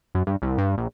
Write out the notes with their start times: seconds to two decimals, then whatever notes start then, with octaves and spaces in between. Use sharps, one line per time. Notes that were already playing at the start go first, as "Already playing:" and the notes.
0.15 F#2
0.27 G2
0.42 C2
0.58 G2
0.78 A#1